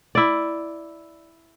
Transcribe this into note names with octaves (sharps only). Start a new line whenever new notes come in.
E4 D5